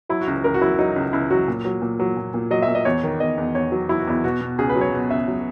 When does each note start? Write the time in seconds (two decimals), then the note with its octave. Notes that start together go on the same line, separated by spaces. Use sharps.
0.09 F#3 E4
0.21 F#4
0.27 C#2
0.44 C#2 A#4
0.54 F#4
0.61 F#3 E4
0.79 F#3 D#4
0.96 C#2
1.13 C#2 E4
1.30 F#3 F#4
1.48 A#2
1.65 F#3
1.82 A#2
2.00 F#3
2.17 A#2
2.34 A#2
2.51 F#3 D#5
2.62 E5
2.68 A#2
2.75 D#5
2.85 E2 C#5
3.04 D#3
3.20 E2 D#5
3.38 E2
3.55 E2 C#5
3.72 F#3
3.89 F#3 E4
3.99 F#4
4.07 E2 E4
4.24 B2 F#4
4.41 B2
4.58 C#2 G#4
4.69 B4
4.76 F#3
4.81 C#5
4.93 B2
5.10 C#2 E5
5.28 F#3